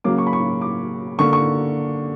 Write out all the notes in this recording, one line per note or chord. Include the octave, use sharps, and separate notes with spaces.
C#3 F#3 A#3 D6
C#6
B5
C#6
D6
D3 A#3 C#6
C#6